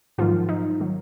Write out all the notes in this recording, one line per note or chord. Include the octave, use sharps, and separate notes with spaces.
G#2 D#3 F3 F#3 F4
D#4
D#3 F#3